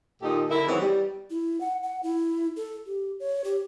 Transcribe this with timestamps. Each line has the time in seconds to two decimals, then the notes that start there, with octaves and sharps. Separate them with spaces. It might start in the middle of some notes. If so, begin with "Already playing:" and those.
0.22 A#2 D#3 D#4 G4 A4 D#5
0.50 D3 E4 A#4
0.67 D#3 E3 F#3 G#3 B3 C4
0.80 G3
1.30 E4
1.61 F#5
1.83 F#5
2.03 E4
2.57 A4
2.86 G4
3.20 C#5
3.44 G4